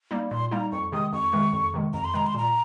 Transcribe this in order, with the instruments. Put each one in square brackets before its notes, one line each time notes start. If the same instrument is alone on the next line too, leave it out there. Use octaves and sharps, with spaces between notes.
[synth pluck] G3 A#3 D#4
[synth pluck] A#2 [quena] C6
[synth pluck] G3 A#3 D#4 [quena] A#5
[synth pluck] F2 [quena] C#6
[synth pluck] C3 D#3 G#3 [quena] D#6
[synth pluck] F2 [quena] C#6
[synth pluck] C3 D#3 G#3
F2
C3 D#3 G#3
[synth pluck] F2 [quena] A#5
[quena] C6
[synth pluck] C3 D#3 G#3 [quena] A#5
[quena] C6
[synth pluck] A#2 [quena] A#5